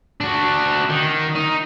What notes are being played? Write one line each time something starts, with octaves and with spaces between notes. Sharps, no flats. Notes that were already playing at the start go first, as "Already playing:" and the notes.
D4 F#4
D#3
D#4